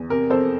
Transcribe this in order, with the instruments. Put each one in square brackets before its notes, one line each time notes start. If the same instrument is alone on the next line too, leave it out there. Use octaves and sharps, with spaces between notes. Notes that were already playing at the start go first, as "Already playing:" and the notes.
Already playing: [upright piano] E2
C3 A#4
F2 A4 C5